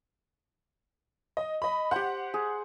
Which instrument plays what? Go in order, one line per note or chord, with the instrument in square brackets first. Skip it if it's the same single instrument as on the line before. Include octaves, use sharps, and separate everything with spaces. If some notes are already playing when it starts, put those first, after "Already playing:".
[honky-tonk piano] D#5
D#5 B5
[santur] G4 C5 [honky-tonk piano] F#5
[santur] G#4